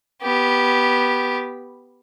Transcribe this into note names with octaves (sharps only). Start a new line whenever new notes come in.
B3 G4